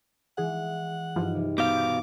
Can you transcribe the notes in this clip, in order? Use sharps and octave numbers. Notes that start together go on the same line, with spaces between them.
E3 G#3 G#4 F#5
G2 E3 F3 D#4 F4 F6
C2
B2 B3 F5 D6 G6